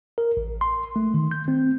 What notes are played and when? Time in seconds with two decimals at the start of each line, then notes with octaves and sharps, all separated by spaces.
0.18 A#4
0.37 A1
0.61 C6
0.96 A3
1.14 D#3
1.31 G6
1.48 C4